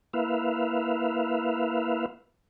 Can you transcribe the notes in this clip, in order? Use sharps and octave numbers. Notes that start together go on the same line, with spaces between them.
A#3 E4 B4 E5 F5